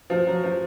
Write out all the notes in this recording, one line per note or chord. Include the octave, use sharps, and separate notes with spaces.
F3
F#3
F3